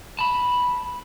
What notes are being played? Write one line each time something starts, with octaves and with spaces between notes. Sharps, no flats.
A5 B5